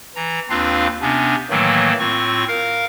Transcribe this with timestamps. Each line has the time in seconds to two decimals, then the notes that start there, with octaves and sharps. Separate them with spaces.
0.15 E3 A#5
0.50 D#2 C4 D4 F4 B4 F5
1.02 C3 B3 C#4 D4
1.50 A2 D#3 E3 F#3 A3 A#3
1.99 A2 C4 F4 C#6
2.48 A#4 F5